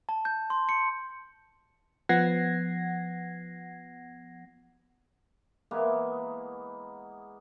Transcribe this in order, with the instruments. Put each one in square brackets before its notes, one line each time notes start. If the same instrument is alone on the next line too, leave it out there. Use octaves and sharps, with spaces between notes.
[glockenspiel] A5
G6
C6
C#7
[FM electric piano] F3 B3 F#5 G#6 A#6 C7
[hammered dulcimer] E3 G#3 A#3 B3